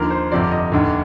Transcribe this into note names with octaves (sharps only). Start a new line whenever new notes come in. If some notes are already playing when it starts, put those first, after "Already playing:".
Already playing: D#2 D3 F3 A#4
C5
G1 F2 C3 F3 D5
D#5
F1 D#2 D3